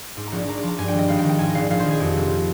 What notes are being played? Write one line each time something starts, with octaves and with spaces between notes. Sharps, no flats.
G#2 D6
A#5
A#1
D6
A#1 A#5
D6
F3 A#5
G2 G#5
G#1 G5
D#5
G#1 F5
G5
D#3
G5
G#2 G#5
D#5
A#1 F5
A#1 F5
C5
D#3
G#4
F2 G4
F1